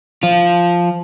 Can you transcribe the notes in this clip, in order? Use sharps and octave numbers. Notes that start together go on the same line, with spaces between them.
F3 F4